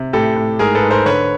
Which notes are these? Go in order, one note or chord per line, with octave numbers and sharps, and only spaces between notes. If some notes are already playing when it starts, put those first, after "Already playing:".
Already playing: C3
A2 G4 A4
A2
G#2 G#4 A#4
A4 B4
G#2
A#4 C5
D3 B4 C#5